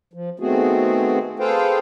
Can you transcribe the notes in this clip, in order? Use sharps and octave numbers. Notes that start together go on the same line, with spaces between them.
F3
D#3 A3 B3 C4 F#4 G#4
G#4 A4 B4 C5 F5 G5